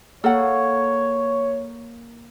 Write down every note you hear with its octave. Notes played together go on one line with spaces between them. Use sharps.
A#3 A4 C#5 F#5